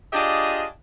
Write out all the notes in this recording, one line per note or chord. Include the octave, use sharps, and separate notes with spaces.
D4 F4 G4 G#4 D#5